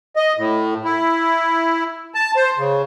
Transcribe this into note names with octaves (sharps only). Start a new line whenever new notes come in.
D#5
A2
E4
A5
C5
C#3